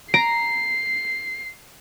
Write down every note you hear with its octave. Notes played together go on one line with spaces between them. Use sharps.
A#5 C7 D7